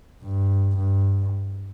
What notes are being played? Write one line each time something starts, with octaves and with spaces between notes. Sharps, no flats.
G2
G2